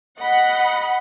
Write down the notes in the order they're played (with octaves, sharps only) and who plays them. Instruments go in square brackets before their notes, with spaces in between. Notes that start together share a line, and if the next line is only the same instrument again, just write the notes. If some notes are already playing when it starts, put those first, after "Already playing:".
[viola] D#5 B5 [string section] F#5